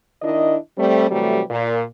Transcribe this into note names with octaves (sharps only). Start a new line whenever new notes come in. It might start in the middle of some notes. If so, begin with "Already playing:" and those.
D#3 D4 E4 D#5
G3 A3 C4
C3 E3 F#3 G3 A3
A#2